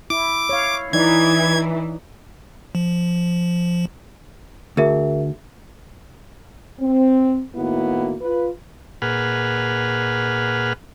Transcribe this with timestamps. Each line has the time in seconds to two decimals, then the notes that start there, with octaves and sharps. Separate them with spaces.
0.10 E4 D6
0.49 C#5 F5
0.93 E3 D#4 D5 G#6
2.75 F3
4.77 D2 G#4 A#4 E5
6.80 C4
7.56 A2 D#3 A#3 B3 E4 F#4
8.22 F4 B4
9.02 A#2 G#4 B4 F#5 F6